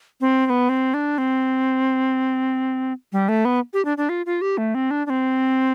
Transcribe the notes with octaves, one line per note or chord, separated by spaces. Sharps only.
C4
C4
B3
C4
D4
C4
G3
A3
B3
G4
D4
D4
F4
F4
G4
A3
C4
D4
D4
C4